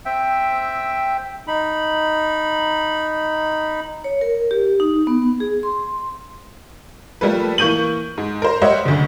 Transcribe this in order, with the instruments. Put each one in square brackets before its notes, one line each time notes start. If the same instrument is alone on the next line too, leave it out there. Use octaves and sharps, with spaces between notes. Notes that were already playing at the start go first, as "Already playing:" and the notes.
[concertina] C4 E5 G5
[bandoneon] D#4 B5
[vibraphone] C#5
A#4
G4
D#4
B3
G#4
C6
[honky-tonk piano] F3 G3 A3 A#3 A4 B4
E3 A#3 C#6 G6 D#7 F#7
G#2
A#4 C5
G3 C5 C#5 D#5 E5 F#5
F#1 D2